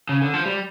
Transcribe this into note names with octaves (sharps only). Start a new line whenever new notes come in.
C#3
D3
F3
G3